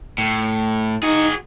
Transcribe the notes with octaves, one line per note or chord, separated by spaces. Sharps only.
A2
D#4 F#4 G#4